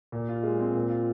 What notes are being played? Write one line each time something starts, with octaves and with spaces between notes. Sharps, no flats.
A#2
F4
G#3
C4
A#2
F4